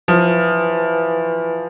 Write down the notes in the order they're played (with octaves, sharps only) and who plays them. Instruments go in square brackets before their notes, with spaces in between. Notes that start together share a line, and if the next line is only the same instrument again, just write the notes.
[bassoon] E3 [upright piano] F3